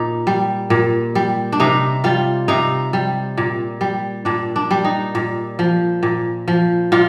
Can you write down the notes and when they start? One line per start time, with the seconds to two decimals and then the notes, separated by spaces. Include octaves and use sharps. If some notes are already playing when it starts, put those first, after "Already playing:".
Already playing: A#2 D#4
0.27 G3
0.70 A#2
1.15 G3
1.52 D4
1.60 C3 D#4
2.04 G3 F4
2.48 C3 D#4
2.93 G3
3.37 A#2
3.81 G3
4.25 A#2 D4
4.56 D4
4.71 G3
4.85 D#4
5.15 A#2
5.59 F3
6.03 A#2
6.48 F3
6.92 A#2 F4